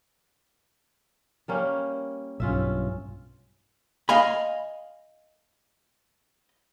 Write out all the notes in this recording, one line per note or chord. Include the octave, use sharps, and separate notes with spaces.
G3 A#3 C#4
B1 G2 C#4 F4 E5
D#5 F5 G#5 B5